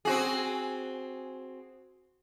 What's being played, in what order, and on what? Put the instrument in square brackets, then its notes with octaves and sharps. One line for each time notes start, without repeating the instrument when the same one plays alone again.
[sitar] C4 F#4 G#4